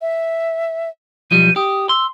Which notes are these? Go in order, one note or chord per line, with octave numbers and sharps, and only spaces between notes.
E5
B1 F3 G3 D#7
G4 D#6
C6 E6